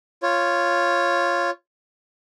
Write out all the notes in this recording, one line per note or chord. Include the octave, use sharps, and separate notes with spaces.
F4 C#5